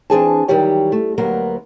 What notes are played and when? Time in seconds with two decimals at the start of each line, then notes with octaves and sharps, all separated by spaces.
0.10 E3 C4 D4 G#4 G#5 A5
0.48 D#3 E3 F#3 G3 G4 C#5
0.92 A3
1.18 D2 F#3 A#3 B3 A#4